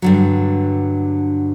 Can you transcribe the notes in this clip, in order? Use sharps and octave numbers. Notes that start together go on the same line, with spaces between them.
G2 D3 F#3